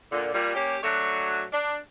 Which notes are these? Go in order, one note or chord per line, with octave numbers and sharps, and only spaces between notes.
A#2 D3
A#2 G3
A#3 C#4 G4
F#3 A3 D4 F#4 C#5
D4